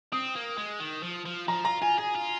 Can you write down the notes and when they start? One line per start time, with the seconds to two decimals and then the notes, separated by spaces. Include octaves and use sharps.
0.12 C4 D#6
0.36 A#3
0.58 G#3
0.80 D#3
1.03 F3
1.25 F3
1.48 F3 A#5
1.65 F4 A#5
1.82 F4 G#5
1.98 G#4 G#5
2.15 F4